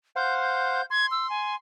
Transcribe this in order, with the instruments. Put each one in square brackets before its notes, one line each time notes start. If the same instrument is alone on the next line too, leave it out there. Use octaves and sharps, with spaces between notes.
[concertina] C5 F5 F#5 [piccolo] G6
[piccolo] G6
[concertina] C6 [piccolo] G#6
[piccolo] E6
G#5